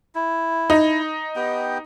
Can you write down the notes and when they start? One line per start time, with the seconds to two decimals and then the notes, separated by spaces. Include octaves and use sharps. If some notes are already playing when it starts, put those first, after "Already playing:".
0.15 E4
0.70 D#4
1.36 B3 G4 G5